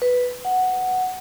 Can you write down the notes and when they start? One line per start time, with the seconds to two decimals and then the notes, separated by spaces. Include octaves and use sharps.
0.02 B4
0.45 F#5